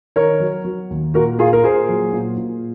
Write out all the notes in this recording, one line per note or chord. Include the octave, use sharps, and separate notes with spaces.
D#3 A#4 C#5
F#3
F#3
D#2
A#2 F#4 A#4
A#3 F4 G#4
A#4
A#2 G#4 C5
F#3
A#2
A#2